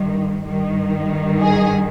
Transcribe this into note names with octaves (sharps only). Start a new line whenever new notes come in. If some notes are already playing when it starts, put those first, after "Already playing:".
Already playing: G2 D#3
G2 D#3
G#4